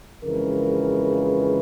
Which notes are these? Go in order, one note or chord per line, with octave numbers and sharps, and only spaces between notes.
F2 C#3 E3 G#3 A#4